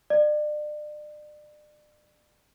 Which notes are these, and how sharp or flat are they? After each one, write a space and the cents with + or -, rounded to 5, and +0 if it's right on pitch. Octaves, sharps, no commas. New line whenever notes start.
D5 +35